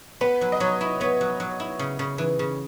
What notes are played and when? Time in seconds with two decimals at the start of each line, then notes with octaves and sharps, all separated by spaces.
0.21 B3 B4
0.41 F#3
0.52 D#5
0.60 F#3 C#5
0.81 E4
1.00 B3 C#5
1.21 F#3
1.40 F#3
1.60 E4
1.79 C#3
1.99 C#3
2.18 E3
2.39 C#3